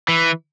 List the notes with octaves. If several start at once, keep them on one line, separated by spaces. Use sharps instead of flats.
E3